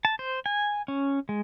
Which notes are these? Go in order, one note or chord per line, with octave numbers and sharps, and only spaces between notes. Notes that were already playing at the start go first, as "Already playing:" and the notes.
A5
C5
G#5
C#4
G#3